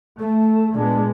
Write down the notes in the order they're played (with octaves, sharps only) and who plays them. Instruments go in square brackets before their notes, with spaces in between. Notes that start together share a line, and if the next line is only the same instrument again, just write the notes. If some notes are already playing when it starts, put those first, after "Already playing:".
[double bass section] A3 [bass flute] A4
[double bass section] A#2 G#3 B3 [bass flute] D4